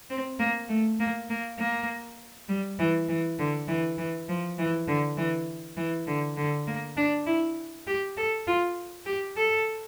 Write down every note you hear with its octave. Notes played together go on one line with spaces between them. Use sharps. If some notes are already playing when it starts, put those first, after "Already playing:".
C4
A#3
A3
A#3
A#3
A#3
G3
E3
E3
D3
E3
E3
F3
E3
D3
E3
E3
D3
D3
A#3
D4
E4
G4
A4
F4
G4
A4